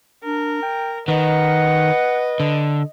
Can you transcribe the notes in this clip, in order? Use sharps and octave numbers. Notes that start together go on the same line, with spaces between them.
D4 A#4
G5
D#3 B4 D#5 F#5
D3